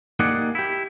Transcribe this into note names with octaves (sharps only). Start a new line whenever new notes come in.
A#3 D#4 G4 G#4 D5 F#5
E4 G4